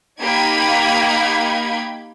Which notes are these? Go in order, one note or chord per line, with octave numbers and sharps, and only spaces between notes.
A#3 D#4 G4 B5 G#6 D7